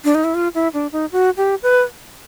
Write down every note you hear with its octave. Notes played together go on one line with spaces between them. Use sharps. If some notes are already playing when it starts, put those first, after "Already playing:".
D4
D#4
E4
F4
E4
D4
D#4
F#4
G4
B4